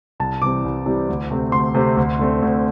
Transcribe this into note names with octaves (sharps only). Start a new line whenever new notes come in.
C2 A5
C3 E3 G3 C4 D6
C2
C3 E3 G3 C4
D2
C3 A3 C4
D2 C6
C3 A3 C4
D2
D3 A3 C4
D2